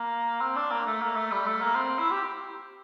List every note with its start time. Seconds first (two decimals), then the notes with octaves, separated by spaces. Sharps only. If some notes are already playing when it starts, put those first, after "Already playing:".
Already playing: A#3
0.41 C4
0.56 D4
0.71 A#3
0.86 A3
1.02 A#3
1.16 A3
1.32 G3
1.46 A3
1.61 A#3
1.76 C4
1.98 E4
2.11 G4